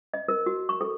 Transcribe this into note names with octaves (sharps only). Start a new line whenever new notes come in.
D#5
A#4
F#4
C#6
A4